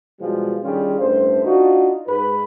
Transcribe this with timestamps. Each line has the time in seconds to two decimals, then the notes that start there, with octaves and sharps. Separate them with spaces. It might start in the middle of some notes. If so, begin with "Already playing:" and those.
0.20 B2 E3 F3 G3 G#3
0.63 D3 D#3 G3 C#4 F4 G#4
0.99 A1 G2 A3 C5
1.44 D4 D#4 F4 F#4
2.07 G#2 B4